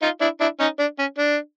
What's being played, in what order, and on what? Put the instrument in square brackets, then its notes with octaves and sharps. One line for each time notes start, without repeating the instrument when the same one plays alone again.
[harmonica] D#4 F4
D4 E4
D4 E4
C#4 D#4
D4
C#4
D4